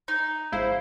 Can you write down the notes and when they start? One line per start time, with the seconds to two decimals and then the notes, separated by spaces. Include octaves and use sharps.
0.08 D#4
0.52 G#1 G#3 E4 C5 F5